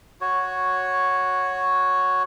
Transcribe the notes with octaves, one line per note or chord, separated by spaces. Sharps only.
F#4 C#5